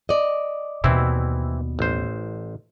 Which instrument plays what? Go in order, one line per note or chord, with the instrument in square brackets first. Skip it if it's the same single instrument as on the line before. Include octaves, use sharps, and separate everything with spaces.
[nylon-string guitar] D5 D#5
[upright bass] D#2 B2 [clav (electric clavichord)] E3 C4 E4
[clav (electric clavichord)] A1 C5